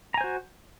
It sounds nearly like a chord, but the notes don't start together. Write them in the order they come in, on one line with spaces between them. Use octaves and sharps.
A#5 G#5 C5 F#4